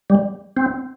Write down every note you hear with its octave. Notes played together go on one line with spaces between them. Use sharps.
G3
C4